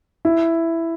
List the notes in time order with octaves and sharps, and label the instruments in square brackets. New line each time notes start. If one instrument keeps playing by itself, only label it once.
[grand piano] E4